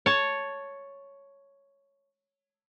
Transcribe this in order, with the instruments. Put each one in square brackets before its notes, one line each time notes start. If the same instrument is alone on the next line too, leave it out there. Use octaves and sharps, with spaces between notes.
[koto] C#5 A5